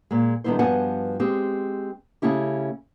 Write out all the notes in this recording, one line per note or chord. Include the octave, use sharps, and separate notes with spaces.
A#2 G#3
D3 D#3 G3 B3 E4 C5
G2 F3 B3 F#4 F#5 G#5
G#3 C4 G4
C#3 A3 C#4 E4 G4